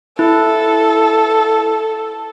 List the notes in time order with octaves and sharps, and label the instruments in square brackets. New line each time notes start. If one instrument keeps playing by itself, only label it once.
[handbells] E4 [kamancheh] A4